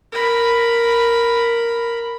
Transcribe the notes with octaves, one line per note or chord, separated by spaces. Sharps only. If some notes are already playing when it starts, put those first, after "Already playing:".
A#4 B5